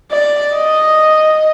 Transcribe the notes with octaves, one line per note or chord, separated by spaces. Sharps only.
D5
D#5